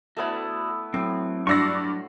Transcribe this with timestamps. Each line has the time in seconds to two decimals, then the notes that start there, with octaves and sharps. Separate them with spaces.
0.17 A3 B3 E4 F#4 A4 D5
0.94 A2 F#3 C4
1.47 G2 F#4 D5 C6 C#6 E6 A#6